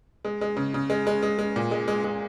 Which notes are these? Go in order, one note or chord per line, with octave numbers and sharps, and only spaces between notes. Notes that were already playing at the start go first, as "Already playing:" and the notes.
G#3
G#3
C#3
C#3
G#3
G#3
G#3
G#3
A#2
G#3
G#3
G#3